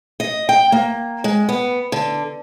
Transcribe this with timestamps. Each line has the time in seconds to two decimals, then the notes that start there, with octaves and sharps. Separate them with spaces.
0.20 D#5
0.49 G5
0.72 A#3
1.24 G#3
1.49 B3
1.92 D3